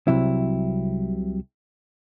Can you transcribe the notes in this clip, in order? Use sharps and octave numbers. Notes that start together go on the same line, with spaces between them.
C2 C3 F#3 E4